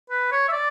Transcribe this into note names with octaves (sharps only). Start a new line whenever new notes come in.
B4
C#5
E5
D5